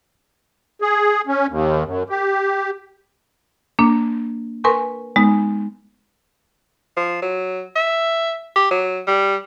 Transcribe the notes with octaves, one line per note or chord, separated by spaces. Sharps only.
G#4
C#4
D#2
F#2
G4
A#3 D4
A#4 B4 G#5 C6 C#6
G#3 B3 D#4
F3
F#3
E5
G4
F#3
G3